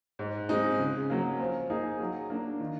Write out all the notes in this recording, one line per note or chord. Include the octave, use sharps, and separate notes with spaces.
G#2
F3 G#3 C4 D#4
C#3
F#3 A#3
F3
A#3 D#4 G#4
F#3
A#3 D4
D#3